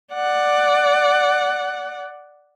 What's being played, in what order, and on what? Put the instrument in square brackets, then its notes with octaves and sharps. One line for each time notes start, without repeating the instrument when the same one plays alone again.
[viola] D5 F#5